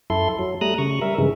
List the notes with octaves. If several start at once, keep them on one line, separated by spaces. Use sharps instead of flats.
F#2 E4 A4 C6
F#3
G3 A3 A#5 D#6 F#6
C#3 C#6
G3 A#4 E5
G2 C#3 E3 G#3